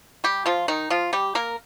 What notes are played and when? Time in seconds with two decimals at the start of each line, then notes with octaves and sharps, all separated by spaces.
0.24 G3 G4
0.46 F3 F4
0.68 D#3 D#4
0.90 F3 F4
1.13 G3 G4
1.35 A#3 A#4